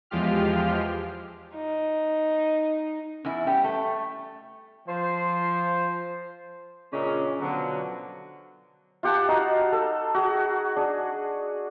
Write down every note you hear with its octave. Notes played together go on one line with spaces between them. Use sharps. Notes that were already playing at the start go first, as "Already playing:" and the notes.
E2 F3 G#3 F4 G4 F6
D#4
E2 C#4 E4
G3 B3 G5
A3 A5
F3 C5
A#2 C#3 G#3 C#4 D4
B2 D3 F3 F#3
F4 G4 F#5 A5
D#4 F#4 F5
A4
F#4 G#4
D4 G#4